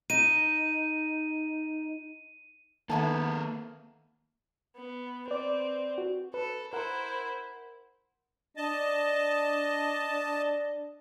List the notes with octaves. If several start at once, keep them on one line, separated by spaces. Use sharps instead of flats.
D#4 D#7
D#3 A#3 B3 E4 A4 G#5 A5
B3
C4 B4 D5
F#4
A4 B4
E4 A#4 C5 F#5
D4 D#5 A5